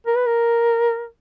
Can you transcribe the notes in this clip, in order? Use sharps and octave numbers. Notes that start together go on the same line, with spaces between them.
A#4
B4
A#4